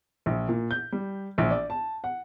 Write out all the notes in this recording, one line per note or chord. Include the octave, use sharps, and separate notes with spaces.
A#1
A#2
G6
G3
A#1
D5
A5
F#5